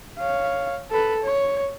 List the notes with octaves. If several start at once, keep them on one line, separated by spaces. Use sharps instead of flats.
C#5 F5
A4 B4
C#5